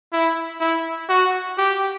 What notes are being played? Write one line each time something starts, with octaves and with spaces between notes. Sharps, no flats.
E4
E4
F#4
G4